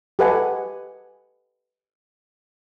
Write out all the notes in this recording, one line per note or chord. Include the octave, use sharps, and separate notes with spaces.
G4 A4 B4 D#5 F#5 G#5